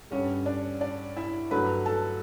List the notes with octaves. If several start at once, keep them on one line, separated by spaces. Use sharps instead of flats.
G2 D3 G3 C#4 C#5
D4 D5
D4 D5
E4 E5
G2 D3 F#3 A3 B4 B5
A4 A5